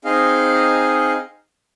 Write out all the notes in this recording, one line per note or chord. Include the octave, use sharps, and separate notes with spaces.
C4 D#4 G#4 D#5 F5